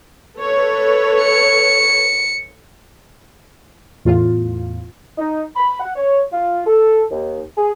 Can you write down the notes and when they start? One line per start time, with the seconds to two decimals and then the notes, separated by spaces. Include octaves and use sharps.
0.38 A4 B4 C#5
1.22 C#7
4.05 E2 A2 F4
5.18 D#4
5.56 B5
5.80 F#5
5.96 C#5
6.33 F4
6.67 A4
7.11 D#2
7.57 G#4